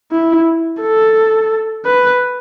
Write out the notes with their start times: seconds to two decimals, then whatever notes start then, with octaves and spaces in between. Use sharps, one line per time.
0.12 E4
0.81 A4
1.85 B4